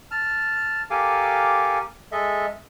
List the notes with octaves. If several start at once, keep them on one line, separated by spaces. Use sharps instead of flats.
A5 F6
G4 A4 A#4 F5 G#5 D6
G#3 A4 D#5 E5